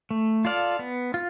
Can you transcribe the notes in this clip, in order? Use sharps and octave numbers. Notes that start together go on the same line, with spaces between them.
A3
F4 A4 D5 F5
B3
F4